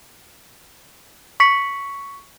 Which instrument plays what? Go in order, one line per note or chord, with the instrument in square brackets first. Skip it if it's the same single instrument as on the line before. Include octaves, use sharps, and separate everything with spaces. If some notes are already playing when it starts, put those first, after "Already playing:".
[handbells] C#6 B6 C#7